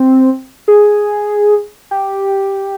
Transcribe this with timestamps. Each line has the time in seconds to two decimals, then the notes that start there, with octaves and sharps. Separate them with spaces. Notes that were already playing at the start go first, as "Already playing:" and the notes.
Already playing: C4
0.68 G#4
1.91 G4